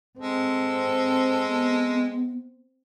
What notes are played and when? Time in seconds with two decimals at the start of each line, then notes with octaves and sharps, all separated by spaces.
0.19 G#3 C4 A4
1.48 B3